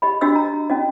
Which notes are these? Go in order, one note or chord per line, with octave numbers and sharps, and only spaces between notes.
G4 D#5 B5
D4 F#4 G4 D#5 E6
A#5
C#4 F#4 D#5